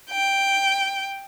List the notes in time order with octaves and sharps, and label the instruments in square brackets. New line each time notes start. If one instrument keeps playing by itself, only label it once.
[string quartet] G5